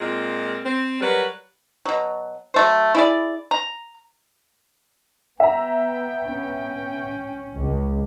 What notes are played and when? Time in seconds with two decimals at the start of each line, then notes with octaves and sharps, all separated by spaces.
0.01 A#2 G#3 C4 F4
0.65 C4
1.01 F#3 G3 A#4 B4
1.85 B2 F#3
2.54 F#3 A3 C5
2.95 E4 G#4 D5
3.51 A#5
5.40 B3 E5 G5 A#5
6.27 C#4
7.55 C#2